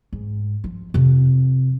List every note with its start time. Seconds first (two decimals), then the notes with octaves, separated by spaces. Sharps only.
0.13 G#2
0.64 F3
0.94 F2 C3